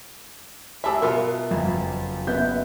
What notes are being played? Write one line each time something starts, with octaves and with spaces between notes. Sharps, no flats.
G#3 G4 E5 G#5 A5 B5 E6
B2 B3 F4 A#4 E5
F#1 F2
F#1 B3 E5 G6